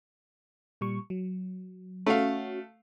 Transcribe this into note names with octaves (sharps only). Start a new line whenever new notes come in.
A#2 G3 C#6
F#3
A3 C#4 F#4 F5